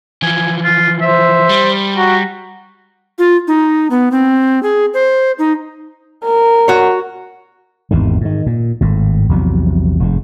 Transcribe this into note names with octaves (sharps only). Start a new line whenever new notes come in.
E3 F3 G#5
F4
C5 E5
G3
F#4 A#5
F4
D#4
B3
C4
G#4
C5
D#4
A#4
F#4 C#5
G#1 E2 C3 D#3
G#2 D#3
A#2
G#1 A2
A#1 E2 C3 F#3
F1 G#2